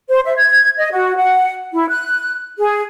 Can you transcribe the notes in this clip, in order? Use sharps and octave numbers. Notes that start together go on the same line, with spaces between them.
C5
E5
G#6
D#5
F#4
F#5
E4
F#6
G#4